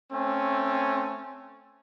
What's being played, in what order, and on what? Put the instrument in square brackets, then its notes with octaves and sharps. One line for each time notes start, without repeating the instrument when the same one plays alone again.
[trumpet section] A3 C4 C#4